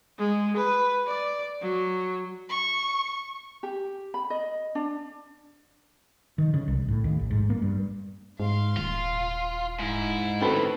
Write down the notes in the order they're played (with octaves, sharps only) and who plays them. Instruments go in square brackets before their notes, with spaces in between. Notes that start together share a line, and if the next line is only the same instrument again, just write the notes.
[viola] G#3
B4
D5
F#3
[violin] C#6
[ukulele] G4
B5
D#5
D4
[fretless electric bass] D#3
C#3
C2
A2
D#2
A1
G#2
A#3
G2
[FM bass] G#2 [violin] F5 C6
[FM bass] D#1 [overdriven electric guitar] F4
[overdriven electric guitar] G#2 [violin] E4
[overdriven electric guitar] A2 D#3 [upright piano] C4 A4 B4